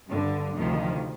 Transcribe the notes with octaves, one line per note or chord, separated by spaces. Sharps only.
G2 D3
D2 C3 D#3 F3